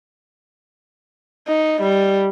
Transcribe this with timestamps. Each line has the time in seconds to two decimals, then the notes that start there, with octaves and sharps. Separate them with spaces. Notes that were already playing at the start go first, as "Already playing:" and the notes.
1.48 D#4
1.82 G3